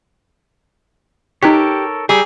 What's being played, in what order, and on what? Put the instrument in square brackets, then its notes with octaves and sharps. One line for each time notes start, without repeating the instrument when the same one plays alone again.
[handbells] D#4 F#6 B6 [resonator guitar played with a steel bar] G4 [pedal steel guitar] A4 A#4 C#5
[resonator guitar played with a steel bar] G3 [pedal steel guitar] G4 A#5 E6 [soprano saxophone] G#4